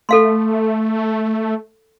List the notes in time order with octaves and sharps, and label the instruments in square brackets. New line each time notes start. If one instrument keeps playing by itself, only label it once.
[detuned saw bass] A3 [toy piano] A4 F5 C6